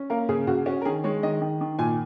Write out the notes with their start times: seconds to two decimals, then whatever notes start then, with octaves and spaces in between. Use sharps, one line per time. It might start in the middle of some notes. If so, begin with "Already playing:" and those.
Already playing: C#4
0.10 A#3 A#4
0.29 C#3 G#4
0.47 C#3 F#4
0.66 C#4 F#4
0.82 A#4
0.85 D#3 G#4
1.04 G#3 C#5
1.23 D#3 D#5
1.41 D#3
1.61 D#3
1.79 A#2 G#5